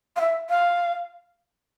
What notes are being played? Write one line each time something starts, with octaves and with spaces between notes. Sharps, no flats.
F5
E5
F5